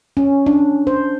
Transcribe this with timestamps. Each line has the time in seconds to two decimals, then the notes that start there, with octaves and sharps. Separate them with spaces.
0.17 C#4
0.46 D4
0.87 C5